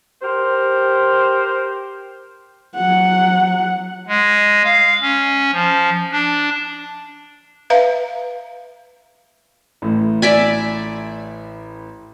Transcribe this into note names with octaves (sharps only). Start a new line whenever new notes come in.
G4 A#4 C5
F#3 F#5
G#3
F5
C#4
F3
D4
B4 E5 F5 A#5
A1 A2
D5 E5 G#5